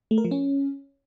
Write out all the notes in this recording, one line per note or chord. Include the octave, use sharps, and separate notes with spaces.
A3
A#4
F3
C#4